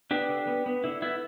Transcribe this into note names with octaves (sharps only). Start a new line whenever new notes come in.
B3 D4 G4
D3
B3
B3
D3 E4
B3 E4